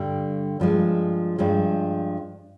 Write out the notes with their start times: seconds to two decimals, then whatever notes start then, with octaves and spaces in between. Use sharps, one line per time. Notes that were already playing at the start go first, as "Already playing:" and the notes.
Already playing: G2 D3 G3
0.60 G2 F3 G#3
1.38 G2 F3 G#3